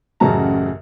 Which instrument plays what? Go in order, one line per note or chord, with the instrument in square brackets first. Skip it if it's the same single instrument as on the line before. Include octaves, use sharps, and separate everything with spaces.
[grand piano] A1 F#2 C#3 F#4 A5 A#5